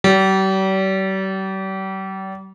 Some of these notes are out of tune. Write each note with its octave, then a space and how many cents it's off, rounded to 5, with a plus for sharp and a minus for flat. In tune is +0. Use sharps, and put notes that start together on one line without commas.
G3 -40